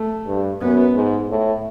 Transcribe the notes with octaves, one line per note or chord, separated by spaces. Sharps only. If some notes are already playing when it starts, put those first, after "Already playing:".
Already playing: A3
G2
F#2 B3
G#2
A2